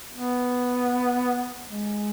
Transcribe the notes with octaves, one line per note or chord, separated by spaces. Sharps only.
B3
G#3